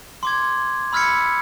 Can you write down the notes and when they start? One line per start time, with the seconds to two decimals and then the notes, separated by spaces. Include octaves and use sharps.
0.23 C6 D6 G#6
0.92 B5 E6 F6 G#6 B6 C#7